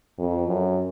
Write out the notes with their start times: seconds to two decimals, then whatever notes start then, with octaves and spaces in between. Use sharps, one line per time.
0.19 F2
0.48 F#2